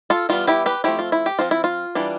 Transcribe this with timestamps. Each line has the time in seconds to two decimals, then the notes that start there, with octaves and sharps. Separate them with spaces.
0.10 F4 A4
0.29 E3 G3 B3 F4
0.47 E4 G4
0.66 G4 B4
0.84 F3 A3 C4 E4 G4
0.99 F4
1.12 E4
1.26 G4
1.39 F3 C4 F4
1.51 E4
1.64 F4
1.95 E3 G3 D4